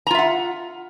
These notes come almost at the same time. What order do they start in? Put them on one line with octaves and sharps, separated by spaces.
A#5 F4 E5 F#5